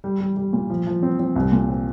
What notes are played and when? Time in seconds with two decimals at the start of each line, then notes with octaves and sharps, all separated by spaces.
0.04 G3
0.20 G3
0.37 G3
0.53 A#2
0.70 F3
0.87 F3
1.03 C4
1.20 C4
1.36 C2
1.52 A#2
1.68 C4